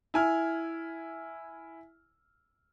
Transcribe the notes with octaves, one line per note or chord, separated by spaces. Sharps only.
E4 G#5 F6